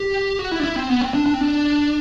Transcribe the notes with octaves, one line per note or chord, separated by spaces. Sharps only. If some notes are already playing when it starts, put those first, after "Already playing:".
Already playing: G4
F#4
E4
D4
E4
C4
B3
C4
D4
D4
C4
D4